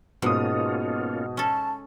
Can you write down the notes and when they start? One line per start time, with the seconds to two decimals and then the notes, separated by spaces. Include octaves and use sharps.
0.22 G#2 B2 A#3 C#4 F4 D#6
1.37 C#4 A4 A5